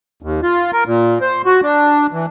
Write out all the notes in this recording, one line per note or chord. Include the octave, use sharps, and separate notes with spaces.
D#2
F4
A#4
A#2
C5
F#4
D4
E3